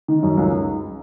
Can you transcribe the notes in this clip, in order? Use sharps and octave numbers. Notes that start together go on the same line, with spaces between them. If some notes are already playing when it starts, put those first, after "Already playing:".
D#3
F#2
C#2